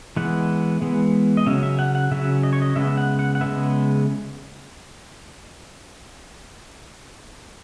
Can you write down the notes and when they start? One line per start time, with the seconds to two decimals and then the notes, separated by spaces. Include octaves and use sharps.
0.16 E3 G#3 B3 F#5
0.81 E3 G#3 B3
1.37 D#5
1.46 C#3 F#3 C#4 E5
1.63 E5
1.79 F#5
1.95 F#5
2.11 C#3 F#3 C#4 E5
2.43 D#5
2.53 C#5
2.62 D#5
2.76 C#3 G#3 B3 E5
2.98 F#5
3.19 F#5
3.35 F#5
3.41 C#3 G#3 B3 E5